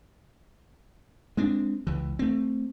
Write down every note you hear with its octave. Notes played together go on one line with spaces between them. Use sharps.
G#3 C4 D4
C#2 E3
A3 C4